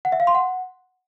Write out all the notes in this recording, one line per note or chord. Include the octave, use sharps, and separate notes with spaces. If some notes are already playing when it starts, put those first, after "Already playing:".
F#5
E5
F5
C6
F#5